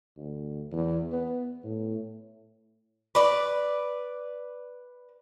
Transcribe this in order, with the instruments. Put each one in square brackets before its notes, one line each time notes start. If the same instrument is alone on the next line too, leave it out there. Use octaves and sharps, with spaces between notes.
[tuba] D2
E2
B3
A2
[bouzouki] B4 D5